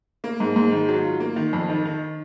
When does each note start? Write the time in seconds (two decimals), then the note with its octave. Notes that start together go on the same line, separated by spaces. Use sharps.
0.24 A#3
0.40 G#2
0.56 G#2
0.71 D#3
0.88 F#3
1.04 F4
1.20 A#3
1.36 D#3
1.53 F2
1.69 D#3
1.85 D#3